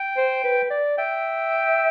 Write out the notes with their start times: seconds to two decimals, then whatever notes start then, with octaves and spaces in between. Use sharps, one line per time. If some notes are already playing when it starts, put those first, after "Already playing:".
Already playing: G5
0.17 C5
0.44 B4
0.70 D5
0.98 E5 G5